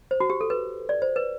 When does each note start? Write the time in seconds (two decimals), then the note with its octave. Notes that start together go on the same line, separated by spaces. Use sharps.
0.11 C5
0.20 F#4
0.30 G4
0.41 A4
0.50 B4
0.89 D5
1.02 C5
1.16 B4